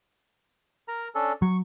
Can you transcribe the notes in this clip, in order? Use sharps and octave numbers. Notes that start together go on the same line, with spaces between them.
A#4 A#5
C#4 D4 A4
F#3 C#6